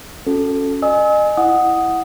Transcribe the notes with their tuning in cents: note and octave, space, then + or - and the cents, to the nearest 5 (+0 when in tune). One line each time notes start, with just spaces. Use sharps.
C#4 +0 F#4 -25 A4 +0
D#5 -30 G#5 +0 E6 -40
E4 +0 F#5 +0 D#6 +0